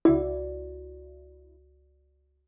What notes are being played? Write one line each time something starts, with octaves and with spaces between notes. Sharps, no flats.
C#2 E4 F#4 D5